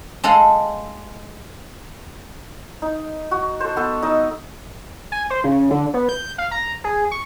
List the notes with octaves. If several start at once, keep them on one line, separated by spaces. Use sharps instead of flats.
G#3 A4 D#5 F5 F#5 C6
D#4
F#4
A4 C5
B3 A4
D#4 D#5 E6
G#5
C5
C#3
D3
B3
G6
F5
A#5
G#4
C#6